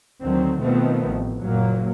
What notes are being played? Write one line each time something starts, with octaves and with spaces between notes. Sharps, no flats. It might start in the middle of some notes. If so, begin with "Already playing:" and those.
D2 D3 D#3 F#3 C4
B2 D#3 F3 A3 B3 C4
A1
F#1 A#2 F#3 A#3